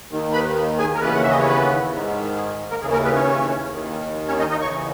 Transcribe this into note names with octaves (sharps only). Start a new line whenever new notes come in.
D#2 D#3
B4 B5
G#4 G#5
A#4
D#2 C#3 E3 B3 B4
F#5
E5
D#5
C#5
B3 B4
G#2 D#3
G#4
A#3 A#4
D#2 C#3 E3 G#4
A#3 A#4
B3 B4
C#4 C#5
D#2 D#3
C#4 C#5
D#4 D#5
D#4 D#5
E2 C#3 E3 C#5 C#6